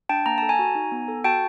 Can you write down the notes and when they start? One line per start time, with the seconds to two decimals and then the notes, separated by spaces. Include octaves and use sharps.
0.09 D4 G5 A5
0.26 A#3 A#5
0.38 A4 A5
0.49 G#5 A#5
0.59 F#4
0.75 D#4
0.92 B3
1.08 A4
1.24 F#4 G5 A5